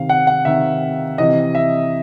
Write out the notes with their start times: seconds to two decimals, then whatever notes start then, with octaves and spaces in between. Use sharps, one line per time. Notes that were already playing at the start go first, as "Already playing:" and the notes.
Already playing: C3 D#3 F5
0.09 F#5
0.27 F#5
0.45 C3 D#3 E5
1.18 C3 E3 D#5
1.55 E5